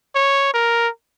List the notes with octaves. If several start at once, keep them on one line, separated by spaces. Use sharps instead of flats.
C#5
A#4